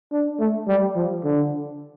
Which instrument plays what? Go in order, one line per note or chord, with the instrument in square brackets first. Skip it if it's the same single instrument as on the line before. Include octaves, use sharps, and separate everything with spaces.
[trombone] D4
A3
G3
F3
D3